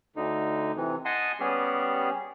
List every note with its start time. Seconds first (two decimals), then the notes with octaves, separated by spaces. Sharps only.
0.16 D2 D3 D#4
0.76 C3 E3
1.05 D#5 F#5 G#5 A5 C6 D#6
1.40 G3 B3 C#4 G4 G#4